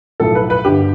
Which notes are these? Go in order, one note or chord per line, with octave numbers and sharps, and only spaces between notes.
B1 A2 F3 A4
B4
B4
G1 G2 D3 G3 G4